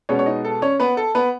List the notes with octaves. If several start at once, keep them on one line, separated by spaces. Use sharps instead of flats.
B2 G#3 B3 C#4 C#5
C#5
D#4 D#5
A4
C#4 C#5
B3 B4
A4
B3 B4